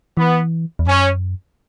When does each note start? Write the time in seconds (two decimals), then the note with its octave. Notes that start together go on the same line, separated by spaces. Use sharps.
0.17 E3 B3
0.79 E2
0.86 F#2 C#4